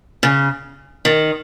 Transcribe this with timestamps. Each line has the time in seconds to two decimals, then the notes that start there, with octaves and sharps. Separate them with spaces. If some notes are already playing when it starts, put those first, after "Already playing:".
0.23 C#3
1.05 D#3